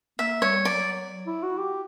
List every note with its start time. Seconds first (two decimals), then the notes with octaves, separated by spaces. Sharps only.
0.19 A#3 E5
0.42 G3 C#5
0.65 F#3 D5
1.27 E4
1.43 F#4
1.57 G4